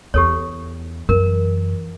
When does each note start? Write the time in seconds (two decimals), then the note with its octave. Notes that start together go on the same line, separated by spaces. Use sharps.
0.14 E2 G4 A4 C#5
1.09 F#2 E3 A#4